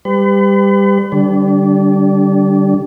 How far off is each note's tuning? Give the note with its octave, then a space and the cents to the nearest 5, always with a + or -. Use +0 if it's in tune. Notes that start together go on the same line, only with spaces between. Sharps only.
G3 +20 B4 +40
D3 +0 G3 -10 D4 -35